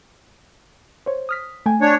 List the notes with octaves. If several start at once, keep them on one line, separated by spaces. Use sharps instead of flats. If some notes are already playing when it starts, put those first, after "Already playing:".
C5 C#5
D#6 F6 B6
A3 G5 G#5
D4 C#5